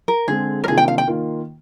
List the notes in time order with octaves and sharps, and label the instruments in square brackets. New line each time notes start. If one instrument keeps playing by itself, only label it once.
[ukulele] A#4
[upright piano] D3 G#3 C4 [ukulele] G#4
[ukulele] A#4
[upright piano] C3 D#3 A#3 D4 F4 [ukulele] G#4
[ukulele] G5
F5
G5
[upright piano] D#3 A#3 F4